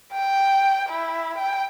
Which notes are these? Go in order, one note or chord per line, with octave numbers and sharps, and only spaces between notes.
G5
E4
G5